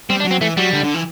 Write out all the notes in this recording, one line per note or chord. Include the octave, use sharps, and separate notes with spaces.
G3 C4
D4
F#3
C4
E3 A3
F#3 G3
D3
D3
E3